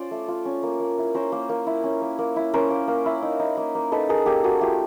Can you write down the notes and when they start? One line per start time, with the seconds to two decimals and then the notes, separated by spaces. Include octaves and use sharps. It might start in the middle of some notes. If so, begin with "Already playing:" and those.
Already playing: C#4 F4 C5 D5
0.11 A3
0.28 F4
0.45 C#4
0.63 A#3
0.80 A#3
0.98 E4
1.14 C#4 A#4 C5
1.32 A#3
1.49 A#3
1.67 E4
1.83 C#4
2.02 A#3
2.19 A#3
2.36 E4
2.54 C#4 A#4 C5
2.70 A#3
2.88 A#3
3.06 E4
3.22 D#4
3.40 D#4
3.57 A#3
3.75 A#3
3.92 D#4 A4 B4
4.09 D#4 G#4 A#4
4.26 A#3 G4 A4
4.44 A#3 F#4 G#4
4.61 A3 F4 G4